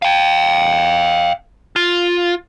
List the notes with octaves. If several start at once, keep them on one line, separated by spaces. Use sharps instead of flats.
F5 G5
F4